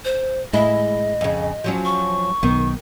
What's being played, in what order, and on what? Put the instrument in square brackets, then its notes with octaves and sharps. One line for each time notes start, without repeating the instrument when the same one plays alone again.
[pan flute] C5
[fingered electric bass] A2 [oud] G#3 E4 [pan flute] D#5
[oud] F2 C#3
F3 F#3 C#4
[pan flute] C#6
[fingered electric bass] B1 B3 [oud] D#3